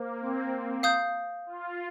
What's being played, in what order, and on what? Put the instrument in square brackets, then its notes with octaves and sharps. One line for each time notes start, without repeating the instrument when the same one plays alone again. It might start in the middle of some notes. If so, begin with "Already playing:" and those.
Already playing: [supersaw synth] A#3 [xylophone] C5
[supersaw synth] C4
C4
[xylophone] F5 D#6 G6
[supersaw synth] F4